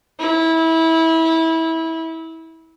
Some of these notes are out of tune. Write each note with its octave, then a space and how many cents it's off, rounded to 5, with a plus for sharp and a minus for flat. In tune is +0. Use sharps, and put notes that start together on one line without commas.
E4 -20